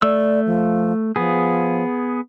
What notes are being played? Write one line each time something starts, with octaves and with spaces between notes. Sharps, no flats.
A3 D5 E6
F3
F3 B3 G#4